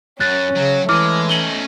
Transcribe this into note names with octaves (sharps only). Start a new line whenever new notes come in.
F#2 C#4 F#6 A6
C#3 F#3
E3 G#3 A3 E4 D6 F6
C#4 D#4 F#7 G7